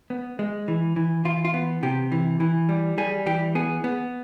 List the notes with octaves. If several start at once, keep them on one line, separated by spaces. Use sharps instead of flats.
B3
G#3
E3
E3
E3 F4
F4
B3
C3 G4
E3
E3
G3
G3 G#4
E3 G4
B3 G#4
B3